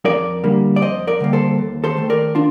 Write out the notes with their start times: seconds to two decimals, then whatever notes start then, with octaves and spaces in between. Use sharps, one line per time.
0.05 F2 A#4 D5
0.44 D3 G3 A#3
0.76 D5
0.81 F2 C5 D#5
1.07 A#4 D5
1.20 D3 G3 A#3
1.33 A4 C5
1.59 D#2
1.84 A4 C5
1.97 D#3 A3
2.10 A#4 D5
2.35 D4 F4